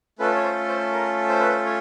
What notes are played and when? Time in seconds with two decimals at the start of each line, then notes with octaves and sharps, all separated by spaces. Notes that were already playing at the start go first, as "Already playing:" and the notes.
0.19 A3 C#4 F4 A4 B4
0.36 C#5
0.43 C5
0.68 C5
0.92 A#4
1.29 C5
1.39 B4
1.49 C5
1.65 C#5